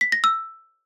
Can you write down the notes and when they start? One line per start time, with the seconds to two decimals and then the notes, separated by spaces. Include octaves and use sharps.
0.01 B6
0.12 A#6
0.24 E6